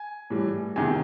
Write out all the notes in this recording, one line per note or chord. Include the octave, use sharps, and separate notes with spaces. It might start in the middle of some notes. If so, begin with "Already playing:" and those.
Already playing: G#5
A2 E3 G3
E2 C3 D#3 G#5